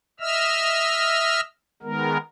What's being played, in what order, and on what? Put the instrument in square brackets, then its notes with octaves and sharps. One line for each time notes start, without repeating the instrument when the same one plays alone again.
[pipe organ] D#5 E5 E6 F6
D#3 G#3 B3 A#4